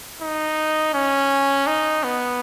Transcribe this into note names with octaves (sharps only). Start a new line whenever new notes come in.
D#4
C#4
D#4
B3